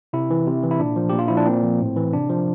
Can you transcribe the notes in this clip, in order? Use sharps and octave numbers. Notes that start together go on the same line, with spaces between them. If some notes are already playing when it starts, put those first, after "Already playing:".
C3 E4
E3
C3
E3
E4
A#2 D4
F3
A#2 G4
F4
F3 E4
D4
A#2 C4
F3
A2
E3
C3 D4
F3